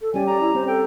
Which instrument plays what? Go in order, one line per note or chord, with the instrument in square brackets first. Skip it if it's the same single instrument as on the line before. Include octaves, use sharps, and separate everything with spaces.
[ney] A4
[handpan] G3 C#4 G4 [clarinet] D5 [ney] G#5
[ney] D5 [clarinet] A#5
[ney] E4
[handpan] C4 [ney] C5
[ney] A4 [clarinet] G5